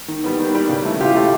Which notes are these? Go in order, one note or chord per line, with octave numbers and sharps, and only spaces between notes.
D#3
G3 B3
D#3
G3 B3
C#3
E3 A3
C#3 F4 G4
E3 A3